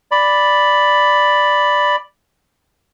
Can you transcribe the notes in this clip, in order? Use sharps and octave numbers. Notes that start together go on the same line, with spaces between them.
D5 B5